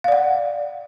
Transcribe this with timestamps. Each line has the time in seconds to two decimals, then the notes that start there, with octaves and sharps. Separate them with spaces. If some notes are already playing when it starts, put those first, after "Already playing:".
0.04 F5
0.08 D5
0.12 F#5